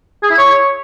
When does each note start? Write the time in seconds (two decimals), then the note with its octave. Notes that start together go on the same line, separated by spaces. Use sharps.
0.23 G#4
0.31 E4
0.38 C#5